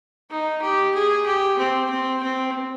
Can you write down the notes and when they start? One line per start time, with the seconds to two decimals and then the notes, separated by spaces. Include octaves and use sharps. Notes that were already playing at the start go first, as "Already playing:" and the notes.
0.31 D#4
0.62 G4
0.95 G#4
1.26 G4
1.58 C4
1.90 C4
2.22 C4